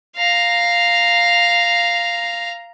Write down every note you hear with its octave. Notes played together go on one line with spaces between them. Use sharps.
F5 A#5